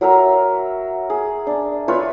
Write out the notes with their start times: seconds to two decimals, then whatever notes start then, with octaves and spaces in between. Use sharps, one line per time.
0.01 F#3 A#4 E5 A#5
1.10 G#4
1.47 D4
1.88 F4 B4 C#5 E5